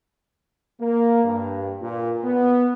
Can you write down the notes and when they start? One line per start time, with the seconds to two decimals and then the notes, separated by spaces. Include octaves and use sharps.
0.80 A#3
1.24 G2
1.81 A#2
2.24 B3